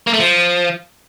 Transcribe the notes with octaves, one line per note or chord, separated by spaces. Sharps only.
A#3
A3
F3